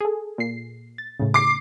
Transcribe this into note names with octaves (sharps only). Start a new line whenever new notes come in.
G#4 A4
A#2 C7
A6
A2 C#3
D6 C7